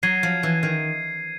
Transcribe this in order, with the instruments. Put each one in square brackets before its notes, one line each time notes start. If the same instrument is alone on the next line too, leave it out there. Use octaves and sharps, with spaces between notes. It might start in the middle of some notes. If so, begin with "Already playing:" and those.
[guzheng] F#3 [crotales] G#6 C7 D#7
[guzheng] F3
E3
D#3